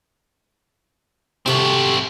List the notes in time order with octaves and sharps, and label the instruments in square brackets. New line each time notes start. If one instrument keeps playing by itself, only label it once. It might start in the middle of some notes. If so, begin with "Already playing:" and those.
[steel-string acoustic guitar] C3 G4 A4 [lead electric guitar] C4 F#4